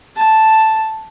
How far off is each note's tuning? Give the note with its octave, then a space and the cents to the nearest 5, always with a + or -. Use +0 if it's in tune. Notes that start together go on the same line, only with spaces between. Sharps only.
A5 +0